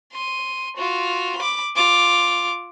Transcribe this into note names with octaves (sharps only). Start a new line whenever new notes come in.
C6 D#7
F4 F#4
B5 D6
F4 D6